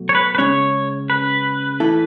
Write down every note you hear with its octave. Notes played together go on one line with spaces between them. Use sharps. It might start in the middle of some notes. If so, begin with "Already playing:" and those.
Already playing: B2 F#3 A3
C#5
B4
B4
C#3 G#3 C#4 C#5
B4
A2 E3 A3 E4 A4